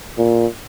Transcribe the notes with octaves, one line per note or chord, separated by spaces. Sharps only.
A#2